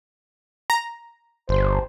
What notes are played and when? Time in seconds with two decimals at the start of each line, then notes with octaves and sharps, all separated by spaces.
0.70 A#5
1.49 G1 C5